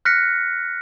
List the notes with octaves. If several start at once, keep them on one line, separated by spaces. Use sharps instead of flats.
F6 F#6 A#6 B6 C#7